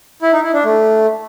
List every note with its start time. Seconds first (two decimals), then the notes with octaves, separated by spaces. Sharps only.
0.22 E4
0.33 D#4
0.43 E4
0.54 D4
0.64 A3